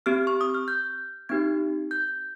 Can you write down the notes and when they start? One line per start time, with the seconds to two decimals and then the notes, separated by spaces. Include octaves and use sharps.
0.06 C4 G4 F6
0.27 C#6
0.41 D#6
0.54 F6
0.68 G6
1.29 C4 D#4 G4 G#6
1.91 G6